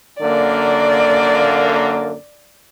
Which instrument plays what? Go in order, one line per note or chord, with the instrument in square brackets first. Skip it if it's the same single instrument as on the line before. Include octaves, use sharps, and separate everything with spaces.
[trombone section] F#2 D3 A#3 [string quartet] D5